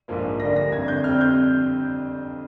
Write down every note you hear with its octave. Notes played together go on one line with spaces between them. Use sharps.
A#1 G#2 F3 A#3
D2 D3 G3 A#3 A#6
A#6
G1 F2 D3 G#6
G6
F2 D3 G3 C4 F6
G6